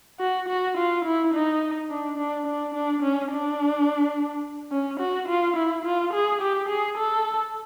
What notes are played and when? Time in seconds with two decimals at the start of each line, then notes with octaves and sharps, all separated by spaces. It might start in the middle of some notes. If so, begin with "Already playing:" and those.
0.20 F#4
0.48 F#4
0.77 F4
1.05 E4
1.34 D#4
1.90 D4
2.17 D4
2.46 D4
2.74 D4
3.02 C#4
3.31 D4
4.72 C#4
5.00 F#4
5.28 F4
5.56 E4
5.85 F4
6.13 G#4
6.41 G4
6.69 G#4
6.98 A4